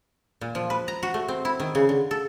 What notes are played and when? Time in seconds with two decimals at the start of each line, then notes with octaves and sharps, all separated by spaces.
0.41 A#2
0.55 F3
0.70 B4
0.88 A#5
1.03 F#4
1.14 A3
1.28 C4
1.45 E4
1.60 D#3
1.75 C#3
1.89 D3
2.11 A4